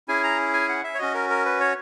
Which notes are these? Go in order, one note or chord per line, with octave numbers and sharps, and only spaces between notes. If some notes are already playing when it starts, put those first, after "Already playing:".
C#4 E4 G#4 G#5
A#5
G#5
F#5
E5
C#5
C#4 F#4 D#5
A#4
A#4
B4
C#5